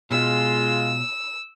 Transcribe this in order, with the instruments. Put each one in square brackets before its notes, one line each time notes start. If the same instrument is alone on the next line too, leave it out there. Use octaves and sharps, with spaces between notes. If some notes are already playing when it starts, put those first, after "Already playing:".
[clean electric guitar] B2 [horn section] G#3 F4 [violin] E6